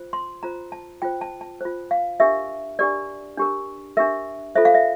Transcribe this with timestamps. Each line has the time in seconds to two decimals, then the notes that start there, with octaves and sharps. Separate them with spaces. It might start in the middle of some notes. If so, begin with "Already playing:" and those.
Already playing: F4 C5
0.13 C6
0.43 F4 C5 A#5
0.72 A5
1.02 F4 C5 G5
1.21 A5
1.41 A5
1.61 F4 C5
1.91 F5
2.20 D4 G4 A#4 E5
2.79 D4 G4 A#4 D5
3.37 D4 G4 A#4
3.97 D4 G4 A#4 E5
4.55 F4 A4 C5 E5
4.65 F5
4.75 E5